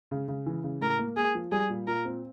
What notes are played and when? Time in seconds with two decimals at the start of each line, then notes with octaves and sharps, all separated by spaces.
0.11 C#3
0.28 C#3
0.46 E3
0.64 C#3
0.81 A2 A#4
0.99 A#3
1.16 A#3 G#4
1.35 F3
1.52 G3 G#4
1.70 A#2
1.88 A#2 A#4
2.05 C4